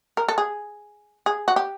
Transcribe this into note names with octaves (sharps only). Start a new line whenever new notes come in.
A#4
A4
G#4
G#4
F#4
G4